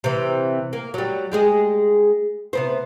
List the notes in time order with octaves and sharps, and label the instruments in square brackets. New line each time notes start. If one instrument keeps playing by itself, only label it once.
[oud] C3 E3
A#3
F#3 G3
G3 G#3 G#4
C3 B3 C5